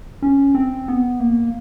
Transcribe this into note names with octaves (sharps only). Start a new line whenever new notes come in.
C#4
C4
B3
A#3